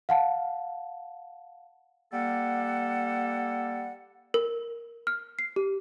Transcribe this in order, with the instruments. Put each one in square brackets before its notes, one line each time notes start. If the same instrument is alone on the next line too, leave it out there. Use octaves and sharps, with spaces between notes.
[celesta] F5 F#5 A5
[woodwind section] G3 A#3 A4 F#5
[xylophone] A#4
F6
C7
G4